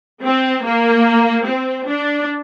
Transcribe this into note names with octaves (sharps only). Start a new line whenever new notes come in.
C4
A#3
C4
D4